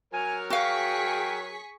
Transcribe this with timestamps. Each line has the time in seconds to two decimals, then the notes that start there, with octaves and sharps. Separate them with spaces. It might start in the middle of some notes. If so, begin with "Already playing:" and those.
0.13 F#3 A#4 C#5 G#5 F6
0.50 F#4 G#4 F5 G5 C#6 B6